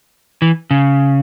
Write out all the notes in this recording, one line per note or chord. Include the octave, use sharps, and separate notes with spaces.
E3
C#3